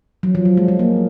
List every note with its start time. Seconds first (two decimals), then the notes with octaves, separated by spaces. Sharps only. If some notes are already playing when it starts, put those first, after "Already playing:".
0.23 F#3
0.35 F3
0.45 F#3
0.57 G#3
0.68 G#3
0.79 A#3